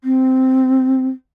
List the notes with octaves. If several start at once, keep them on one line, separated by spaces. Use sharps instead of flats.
C4